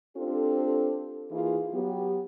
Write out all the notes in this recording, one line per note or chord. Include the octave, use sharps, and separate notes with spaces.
C4 D4 F4 G4 A4
E3 A#3 D#4 F4 G#4
F#3 B3 G4